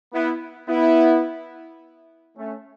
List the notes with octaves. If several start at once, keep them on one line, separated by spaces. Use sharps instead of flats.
B3 E4
B3 E4
A3 C#4